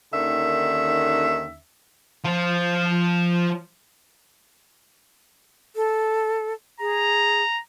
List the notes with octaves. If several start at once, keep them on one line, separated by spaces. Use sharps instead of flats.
D#2 D3 D#3 C#4 E5
F3 F4
A4
G#4 A#5